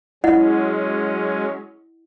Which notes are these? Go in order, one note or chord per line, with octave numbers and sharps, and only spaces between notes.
F#3 G#3 C#4 E4 D#5 F#5